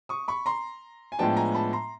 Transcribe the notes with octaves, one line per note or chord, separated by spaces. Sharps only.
C#6 D#6
B5 C#6
A#5 C6
G#5
A2 F3 G#3 B3 D4 G5 A5
G#5 A#5
A5 B5
A#5 C6